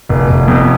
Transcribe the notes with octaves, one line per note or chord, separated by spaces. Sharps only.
F1
F1
F2